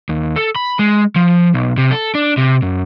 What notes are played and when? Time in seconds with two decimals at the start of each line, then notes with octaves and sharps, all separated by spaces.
0.09 D#2
0.36 A4
0.55 B5
0.79 G#3
1.16 F3
1.54 B1
1.77 C3
1.91 A4
2.15 D4
2.37 C3
2.62 F#2